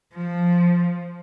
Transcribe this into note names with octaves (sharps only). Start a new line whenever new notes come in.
F3